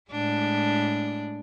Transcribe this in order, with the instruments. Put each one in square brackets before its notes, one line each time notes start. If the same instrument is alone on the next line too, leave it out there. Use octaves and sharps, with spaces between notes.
[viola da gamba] A2 G#3 D4